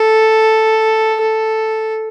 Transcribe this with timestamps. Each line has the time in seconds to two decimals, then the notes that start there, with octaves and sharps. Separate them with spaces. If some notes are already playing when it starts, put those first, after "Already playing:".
Already playing: A4
1.21 A4